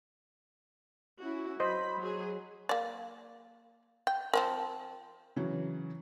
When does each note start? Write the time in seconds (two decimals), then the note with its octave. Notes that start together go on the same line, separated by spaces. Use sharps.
1.19 C#4 E4 F#4
1.60 F#3 C5 D#5 B5
1.98 F#3 G#4
2.69 A#3 D5
4.07 G5
4.34 F3 C4 A#4
5.36 C#3 E3 F#3